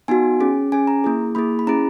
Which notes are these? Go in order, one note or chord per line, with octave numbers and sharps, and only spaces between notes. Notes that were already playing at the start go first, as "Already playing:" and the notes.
B3 D#4 F#4 G#5
C#4 G#4
C#4 G#4 G#5
A#5
A#3 E4 G#4
A#3 E4 G#4 B5
B5
C#4 E4 G#4 A#5